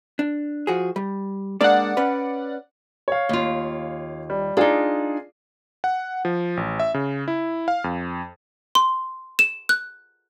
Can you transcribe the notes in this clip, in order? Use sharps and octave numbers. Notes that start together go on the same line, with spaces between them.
D4
F3 F#4 G#4
G3
G#3 A#3 D4 D5 F#5
C#4 B4
C#5 F5
D#2 F4
G3
D4 D#4 F4 G#4 D5
F#5
F3
A1
E5
C#3
E4
F5
F2
C6
E7
F#6